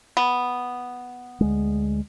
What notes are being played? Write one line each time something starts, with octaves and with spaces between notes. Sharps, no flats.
B3
D2 G#3